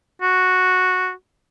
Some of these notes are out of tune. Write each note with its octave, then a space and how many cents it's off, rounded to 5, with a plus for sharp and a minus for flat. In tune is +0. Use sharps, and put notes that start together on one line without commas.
F#4 -5